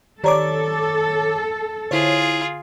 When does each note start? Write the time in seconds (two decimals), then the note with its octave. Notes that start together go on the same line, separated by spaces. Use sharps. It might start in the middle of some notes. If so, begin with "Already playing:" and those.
0.24 D#3 G4 A4 C#5 D5 A#5 D6
1.91 D3 E4 F4 G#4 C#5